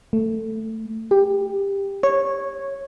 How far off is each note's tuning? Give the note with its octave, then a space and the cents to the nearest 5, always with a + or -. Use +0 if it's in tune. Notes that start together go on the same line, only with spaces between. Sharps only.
A3 +10
G4 +15
C#5 -10